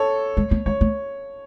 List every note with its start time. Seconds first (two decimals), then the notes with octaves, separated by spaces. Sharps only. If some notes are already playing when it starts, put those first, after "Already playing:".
Already playing: A4 C#5
0.37 G#3
0.51 A3
0.66 G#3 C#5
0.81 A3